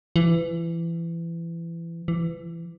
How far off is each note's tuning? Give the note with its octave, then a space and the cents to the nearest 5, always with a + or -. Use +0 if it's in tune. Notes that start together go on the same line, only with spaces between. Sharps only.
E3 +25
E3 +25